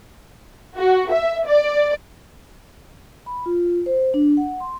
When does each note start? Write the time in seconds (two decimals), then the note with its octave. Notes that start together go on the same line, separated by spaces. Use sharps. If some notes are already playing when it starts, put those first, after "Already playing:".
0.77 F#4
1.11 E5
1.46 D5
3.26 B5
3.46 F4
3.86 C5
4.14 D4
4.37 F#5
4.60 C6